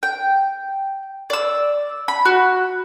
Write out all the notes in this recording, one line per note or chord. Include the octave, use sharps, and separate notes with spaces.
G5
D5 E6
B5
F#4